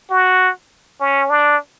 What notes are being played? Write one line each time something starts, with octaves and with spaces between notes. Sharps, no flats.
F#4
C#4
D4